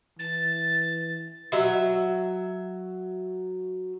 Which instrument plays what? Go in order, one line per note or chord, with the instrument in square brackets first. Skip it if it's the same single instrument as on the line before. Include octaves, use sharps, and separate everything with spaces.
[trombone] E3 [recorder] A6
[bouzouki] F#3 E5